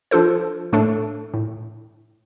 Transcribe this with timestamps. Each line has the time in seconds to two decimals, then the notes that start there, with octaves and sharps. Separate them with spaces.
0.11 F3 D4 F4 A4 C5
0.73 A2 A3 D4 A4
1.34 A2